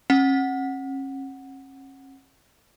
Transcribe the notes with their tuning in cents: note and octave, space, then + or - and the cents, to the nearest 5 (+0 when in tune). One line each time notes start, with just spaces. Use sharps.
C#4 -40 F#5 +0